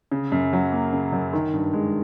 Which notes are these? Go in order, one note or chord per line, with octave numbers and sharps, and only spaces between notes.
C#3
F#2
F#3
A#3
C#3
F#2
D#3
G2
G#3